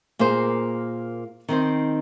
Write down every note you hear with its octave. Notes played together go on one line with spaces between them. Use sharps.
A#2 A#3 G#4 C5
D#3 C4 D#4 C5